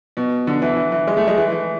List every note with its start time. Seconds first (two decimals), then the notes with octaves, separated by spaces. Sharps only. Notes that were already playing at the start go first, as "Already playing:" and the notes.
0.17 B2
0.47 D3
0.62 E3
0.76 E3
0.92 E3
1.07 G#3
1.17 A3
1.27 G#3
1.38 E3
1.52 E3